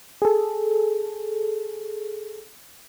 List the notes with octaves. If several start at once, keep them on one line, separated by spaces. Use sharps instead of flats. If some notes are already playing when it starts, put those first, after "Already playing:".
G#4 A4